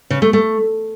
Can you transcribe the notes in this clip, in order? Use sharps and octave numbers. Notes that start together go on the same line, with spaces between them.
C#3
A3
A3